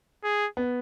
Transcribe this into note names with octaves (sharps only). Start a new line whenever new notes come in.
G#4
B3